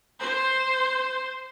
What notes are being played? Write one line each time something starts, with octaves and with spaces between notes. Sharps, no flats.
C5